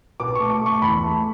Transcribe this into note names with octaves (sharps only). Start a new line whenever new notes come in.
B2 D6
A3 C#6
D6
A3 C#6
E2 B5
A3